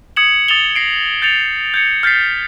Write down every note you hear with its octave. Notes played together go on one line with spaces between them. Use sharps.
D#6 G#6 C#7 E7 F#7
D#6 A6 E7 F7 G7
A#6 C7 D7
G6 A6 C#7 F7
G6 G#6 C#7
F6 G6 A6 B6 C7